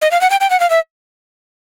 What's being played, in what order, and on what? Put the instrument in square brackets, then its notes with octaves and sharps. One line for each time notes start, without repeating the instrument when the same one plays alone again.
[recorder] D#5
F5
F#5
G5
G5
F#5
F5
E5